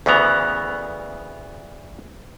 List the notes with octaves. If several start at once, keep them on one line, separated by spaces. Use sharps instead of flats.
D2 C#3 E3 B3 A#5